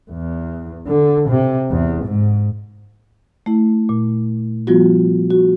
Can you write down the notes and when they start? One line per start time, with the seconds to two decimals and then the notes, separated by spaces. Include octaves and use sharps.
0.11 E2
0.87 D3
1.29 C3
1.71 E2
2.05 G#2
3.46 A3 E4
3.89 A#2
4.67 F3 G3 B3 F4 F#4
5.30 F#4